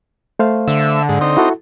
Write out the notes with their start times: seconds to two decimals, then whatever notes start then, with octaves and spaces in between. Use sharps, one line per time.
0.39 A3 C5 F5
0.68 D3 E5
1.09 G#2
1.21 C4 D#4
1.37 E4 F#4 A4